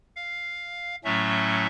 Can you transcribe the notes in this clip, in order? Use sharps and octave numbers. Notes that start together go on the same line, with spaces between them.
F5
A2 F#3 A3 C#4 E5